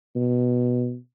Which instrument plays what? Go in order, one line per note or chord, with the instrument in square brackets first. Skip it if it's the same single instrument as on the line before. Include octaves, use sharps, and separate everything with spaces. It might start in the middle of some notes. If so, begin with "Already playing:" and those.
[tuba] B2